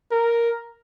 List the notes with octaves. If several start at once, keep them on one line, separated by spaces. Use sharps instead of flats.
A#4